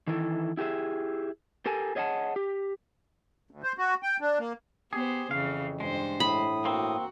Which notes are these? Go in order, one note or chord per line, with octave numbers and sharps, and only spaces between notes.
D#3 E3 E4 A4
E4 G4 G#4 E5
G4 A4 A#4 G#5
G#4 C#5 D#5 E5 F#5 A5
G4
D2
C5
F#4
G5
D4
A#3
B3 G4 G#4 C5
F2 C#3 E3 F5
G2 G#3 C5
A2 B5 D#6
A#3 C4 F#4